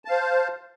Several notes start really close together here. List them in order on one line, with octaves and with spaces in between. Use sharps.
A5 F5 C5